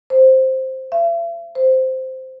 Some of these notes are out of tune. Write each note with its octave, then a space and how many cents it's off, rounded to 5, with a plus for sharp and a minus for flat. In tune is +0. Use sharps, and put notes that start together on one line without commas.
C5 +5
E5 +45
C5 -5